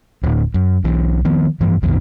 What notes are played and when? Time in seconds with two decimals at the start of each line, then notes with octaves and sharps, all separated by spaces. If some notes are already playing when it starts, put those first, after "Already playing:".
0.23 D1
0.54 F#2
0.84 B1 E3
1.25 D#3 F3 B3
1.60 G2 E3 F3
1.82 B1 F2 B2 D#3